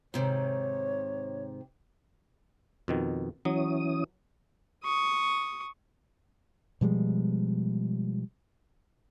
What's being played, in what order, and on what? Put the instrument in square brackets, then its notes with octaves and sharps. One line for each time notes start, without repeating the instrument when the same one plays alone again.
[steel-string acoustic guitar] G#2 C3 D#3 [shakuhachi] C#5
[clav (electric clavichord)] F2 B2 D#3
[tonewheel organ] E3 C#4 D#6 [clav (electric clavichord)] F#3
[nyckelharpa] C#6 D#6
[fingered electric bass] B2 F3 G3 G#3